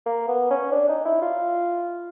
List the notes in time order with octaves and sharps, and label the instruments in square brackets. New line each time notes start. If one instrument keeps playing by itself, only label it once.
[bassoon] A#3
B3
C#4
D4
D#4
E4
F4